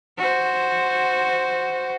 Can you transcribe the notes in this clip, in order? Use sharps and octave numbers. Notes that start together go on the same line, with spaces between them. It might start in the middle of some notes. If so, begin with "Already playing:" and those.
F#4 C5